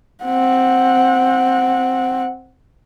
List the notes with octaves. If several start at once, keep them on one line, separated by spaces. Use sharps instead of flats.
C4 F#5